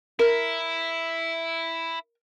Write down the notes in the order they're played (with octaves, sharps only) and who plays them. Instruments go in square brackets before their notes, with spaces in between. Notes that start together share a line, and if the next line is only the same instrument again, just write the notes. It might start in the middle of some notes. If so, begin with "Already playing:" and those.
[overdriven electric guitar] E4 [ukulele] A#4